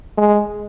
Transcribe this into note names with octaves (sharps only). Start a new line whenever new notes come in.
G#3